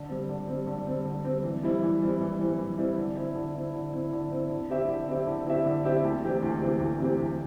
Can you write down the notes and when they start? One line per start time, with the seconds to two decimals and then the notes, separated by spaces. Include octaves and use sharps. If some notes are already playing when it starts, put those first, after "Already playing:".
Already playing: D3
0.09 G3 C4
0.29 D3
0.47 G3 C4
0.67 D3
0.86 G3 C4
1.05 D3
1.24 G3 C4
1.44 E3
1.63 G3 C4 E4
1.82 E3
2.01 G3 C4 E4
2.21 E3
2.39 G3 C4 E4
2.58 E3
2.78 G3 C4 E4
2.97 D3
3.16 C4 E4
3.35 D3
3.55 C4 E4
3.74 D3
3.93 C4 E4
4.13 D3
4.31 C4 E4
4.50 D3
4.69 C4 E4 G4 E5
4.88 D3
5.08 C4 E4 G4 E5
5.27 D3
5.46 C4 E4 G4 E5
5.66 D3
5.84 C4 E4 G4 E5
6.04 D2
6.24 C3 E3 C4 G4
6.42 D2
6.61 C3 E3 C4 G4
6.80 D2
7.00 C3 E3 C4 G4
7.19 D2